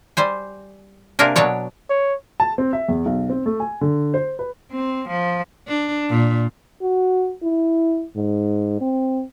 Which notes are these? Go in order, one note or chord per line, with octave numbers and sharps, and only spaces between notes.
G3 C5 G#5
C3 A#3 D4 A#4 G#5
B2 F#3 D4 C#5 D5
C#5
A5
C4
E5
E2
B1
C4
A3
G#5
D3
C5
B4
C4
F3
D4
A#2
F#4
E4
G#2
C4